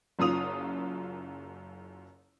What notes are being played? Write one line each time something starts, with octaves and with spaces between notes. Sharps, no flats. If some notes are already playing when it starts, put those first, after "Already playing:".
F#1 F#2 F4 D#6 F7